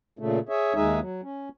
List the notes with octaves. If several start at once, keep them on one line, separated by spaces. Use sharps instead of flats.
A#2 C#3 A3
G#4 C#5 E5
D#2 G#3 D#4 G#4 E5
F#3
C#4